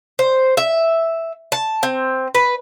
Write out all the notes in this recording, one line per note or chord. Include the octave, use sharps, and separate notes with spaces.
C5
E5
A5
C4
B4